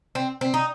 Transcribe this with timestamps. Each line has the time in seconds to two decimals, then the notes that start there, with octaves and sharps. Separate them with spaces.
0.15 C4
0.41 C4
0.54 D#4